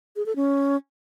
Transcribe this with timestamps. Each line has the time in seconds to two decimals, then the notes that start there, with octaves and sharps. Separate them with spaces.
0.16 G#4
0.26 A4
0.36 C#4